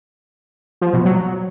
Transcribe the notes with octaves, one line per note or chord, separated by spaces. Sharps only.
F3
B2
F#3